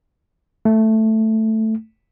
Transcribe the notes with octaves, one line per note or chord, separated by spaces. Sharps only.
A3